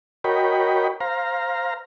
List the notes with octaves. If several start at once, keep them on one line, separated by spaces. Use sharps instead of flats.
F#4 A#4 C#5 D#5 G5 B5
C5 F5 A#5